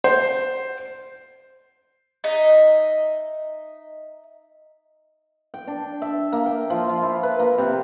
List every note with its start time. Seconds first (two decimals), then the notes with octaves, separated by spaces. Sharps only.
0.04 C5
2.24 D#4 D#5 E5
5.54 G5
5.68 D4
6.02 E5
6.32 A#3
6.46 G5
6.70 F3
6.89 F4
7.03 E4
7.23 B4
7.39 A#3
7.58 C3